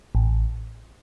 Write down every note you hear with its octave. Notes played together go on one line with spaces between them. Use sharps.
A1